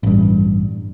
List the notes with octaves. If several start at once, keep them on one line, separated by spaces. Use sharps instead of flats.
A1 G2